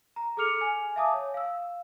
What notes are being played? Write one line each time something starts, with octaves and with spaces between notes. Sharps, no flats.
A#5
G#4 A4 D6 F6 C#7 F7
G#5
E5 F5 G#5 A5 D6 D#6
C#5
F5 E6